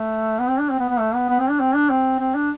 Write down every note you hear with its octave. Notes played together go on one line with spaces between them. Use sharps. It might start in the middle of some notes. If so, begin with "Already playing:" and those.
Already playing: A3
B3
C4
D4
C4
B3
B3
A3
B3
B3
C4
D4
C4
D4
C4
C4
D4